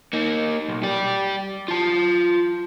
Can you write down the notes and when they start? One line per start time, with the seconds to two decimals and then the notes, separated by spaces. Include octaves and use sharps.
0.13 A#3 D#4
0.68 B1
0.83 G4 D5
1.68 F4 A5